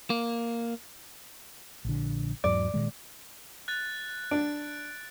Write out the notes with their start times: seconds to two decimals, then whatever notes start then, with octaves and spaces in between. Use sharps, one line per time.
0.10 A#3
1.85 A#1 D3
2.44 E2 G#2 F#3 D5
2.74 A#2 D#3 G#3
3.68 F#6 A6
4.31 D4 D7